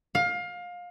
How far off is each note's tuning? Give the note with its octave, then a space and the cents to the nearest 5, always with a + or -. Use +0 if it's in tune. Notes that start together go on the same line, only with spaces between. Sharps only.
F5 +25